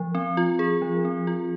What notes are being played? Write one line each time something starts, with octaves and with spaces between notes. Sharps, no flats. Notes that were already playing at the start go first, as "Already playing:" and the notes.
Already playing: F3
C4
F4
G#4
F3
C4
F4